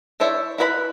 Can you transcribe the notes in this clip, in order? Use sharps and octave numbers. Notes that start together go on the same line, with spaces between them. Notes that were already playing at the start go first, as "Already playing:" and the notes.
D4 E4 C5 C#5 E5
E4 A#4 B4 C#5 B5